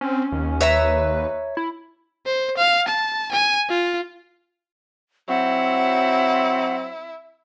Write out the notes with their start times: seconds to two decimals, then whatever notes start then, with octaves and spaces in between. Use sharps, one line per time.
0.01 C4 C#4
0.32 D#2
0.61 B4 C#5 E5 A#5
1.57 E4
2.26 C5
2.57 F5
2.88 A5
3.32 G#5
3.69 F4
5.29 F#3 C4 E4 F#5